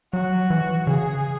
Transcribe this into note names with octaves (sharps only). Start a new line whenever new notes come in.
F#3 F#4
E3
C#3 G#4